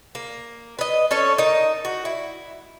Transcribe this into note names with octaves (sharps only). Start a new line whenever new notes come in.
A#3
B4 D#5
C#4 A4 C#5
D#4 A#4
F#4
E4